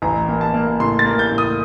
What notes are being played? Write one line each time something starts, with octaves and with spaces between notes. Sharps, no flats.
A1 A#5
A#3
A5
A#3
A2 C6
A6
A#3
G6
A2
D#6